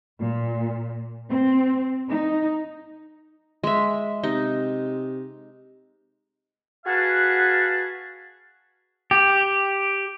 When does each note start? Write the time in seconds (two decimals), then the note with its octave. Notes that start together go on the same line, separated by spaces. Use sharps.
0.20 A#2
1.28 C4
2.10 D#4
3.64 G#3 E5
4.23 C3 D#4
6.86 F#4 G#4 B4 F5 F#5 A5
9.11 G4